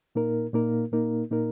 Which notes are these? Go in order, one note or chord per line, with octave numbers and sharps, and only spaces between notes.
A#2 A#3 D#4 A#4
A#2 A#3 D#4 A#4
A#2 A#3 D#4 A#4
A#2 A#3 D#4 A#4